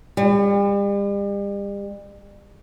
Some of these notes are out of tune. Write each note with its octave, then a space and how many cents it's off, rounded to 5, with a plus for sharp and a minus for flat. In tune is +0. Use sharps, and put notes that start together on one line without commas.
G3 +40